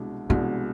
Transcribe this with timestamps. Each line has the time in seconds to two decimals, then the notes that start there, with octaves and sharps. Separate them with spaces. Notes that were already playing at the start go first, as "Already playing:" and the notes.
Already playing: C2 B2 G#3 D4
0.29 C2 B2 G#3 C4 D4